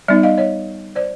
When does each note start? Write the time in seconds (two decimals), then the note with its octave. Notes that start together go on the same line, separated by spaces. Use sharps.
0.08 G3 B3 D#4 D5 E5
0.23 D#5 F5
0.38 C#5 D#5
0.96 C5 D5